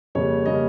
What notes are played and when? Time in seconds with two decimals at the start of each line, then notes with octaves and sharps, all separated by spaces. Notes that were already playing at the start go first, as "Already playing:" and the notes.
0.15 F2 C#3 G3 A#3 C#5
0.46 C#3 G3 A#3 D#5